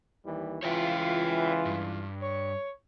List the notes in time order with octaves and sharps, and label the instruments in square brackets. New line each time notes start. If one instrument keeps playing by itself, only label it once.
[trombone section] D#2 E3 G3
[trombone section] C#2 E3 [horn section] F4 [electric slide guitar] C#5 E5 G5
[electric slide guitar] G2
[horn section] C#5